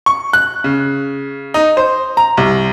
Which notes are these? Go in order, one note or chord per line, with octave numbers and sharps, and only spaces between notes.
C#6
F#6
C#3
D#4
C5
A#5
C2